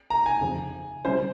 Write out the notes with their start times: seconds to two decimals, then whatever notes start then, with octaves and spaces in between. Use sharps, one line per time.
0.10 A#5
0.26 G#5
0.41 F2 C#3 F3
1.05 C#3 G3 C#4 E4 C5